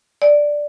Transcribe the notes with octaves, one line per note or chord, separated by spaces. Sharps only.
D5